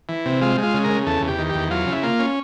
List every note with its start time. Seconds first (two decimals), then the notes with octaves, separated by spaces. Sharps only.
0.09 E3
0.26 C3
0.41 G#3 F4
0.58 G#3
0.63 F4
0.74 C#3
0.84 A#4
0.89 C#3
1.06 E2 A4
1.22 E2
1.28 G4
1.38 D#3
1.49 G4
1.55 E2
1.71 F#3 F4
1.87 C#3
1.92 E4
2.03 A#3 F4
2.19 C#4